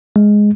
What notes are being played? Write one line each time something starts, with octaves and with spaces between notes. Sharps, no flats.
G#3